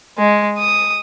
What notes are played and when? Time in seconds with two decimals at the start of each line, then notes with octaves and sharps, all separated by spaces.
0.18 G#3
0.58 D#6